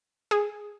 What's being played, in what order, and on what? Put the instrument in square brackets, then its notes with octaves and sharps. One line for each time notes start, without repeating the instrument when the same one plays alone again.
[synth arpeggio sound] G#4